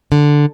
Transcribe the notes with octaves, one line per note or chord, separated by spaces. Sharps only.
D3